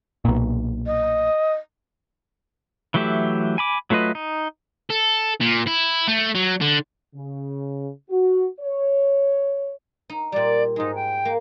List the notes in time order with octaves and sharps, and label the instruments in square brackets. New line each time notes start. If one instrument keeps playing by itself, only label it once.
[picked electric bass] B1 A#2
[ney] D#5
[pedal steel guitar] E3 F#3 A3 G4 E5
G#5 B5 D6
F#3 A3 F4 B4 D#5
D#4
[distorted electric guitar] A4
A#2
E4
A3
F#3
D3
[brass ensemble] C#3
F#4
C#5
[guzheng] D#4
[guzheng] A#2 G3 [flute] D5
[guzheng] G#2 G#3 [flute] D#4
[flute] G5
[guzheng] A#3